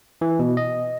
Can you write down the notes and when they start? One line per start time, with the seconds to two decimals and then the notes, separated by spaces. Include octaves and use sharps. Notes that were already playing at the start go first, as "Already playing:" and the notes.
0.21 E3
0.39 B2
0.57 D#5